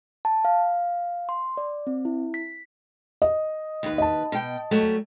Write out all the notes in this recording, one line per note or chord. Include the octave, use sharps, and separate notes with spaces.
A5
F5
C6
D5
C4
E4
B6
D#5
D#2 B4
D#5 A5
B2 G5
F#3 G3 A3